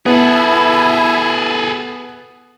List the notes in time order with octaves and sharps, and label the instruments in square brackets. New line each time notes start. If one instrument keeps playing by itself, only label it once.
[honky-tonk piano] B3 [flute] E4 [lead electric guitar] G#4 A4